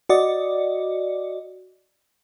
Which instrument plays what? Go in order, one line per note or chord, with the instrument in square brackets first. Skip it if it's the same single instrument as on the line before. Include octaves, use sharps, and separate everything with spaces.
[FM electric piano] F#4 D5 D#5